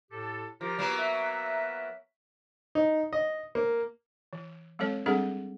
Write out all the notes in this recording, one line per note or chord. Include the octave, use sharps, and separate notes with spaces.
A2 G4 A4
F3 F4 G4 A#4
F#3 A#3 B3
E5
D#4
D#5
A#3
E3
F#3 G#3 C4 A4 C#5
G3 C4 D4 G#4 A4 F#5